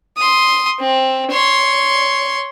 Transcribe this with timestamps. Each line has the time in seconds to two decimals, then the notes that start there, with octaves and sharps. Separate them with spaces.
0.17 C6 D#6
0.80 C4
1.31 C#5 C6